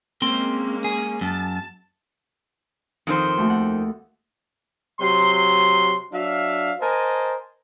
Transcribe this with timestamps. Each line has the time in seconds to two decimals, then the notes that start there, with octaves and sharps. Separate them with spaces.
0.22 G#3 A#3 C4 C#4 C6
0.84 G#4
1.21 F#2 A5
3.07 F2 D#3 D#4 A4 C5 A#5
3.37 D#2 A3 F#4
3.50 F#5
5.00 C3 F#3 C6
6.13 F#3 D4 E5 F5
6.81 A#4 C5 D#5 G#5 A5